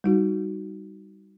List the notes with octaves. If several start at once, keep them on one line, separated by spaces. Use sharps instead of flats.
G3 D#4 F#4